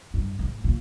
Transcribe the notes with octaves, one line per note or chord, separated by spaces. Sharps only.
G2
G#2
A#2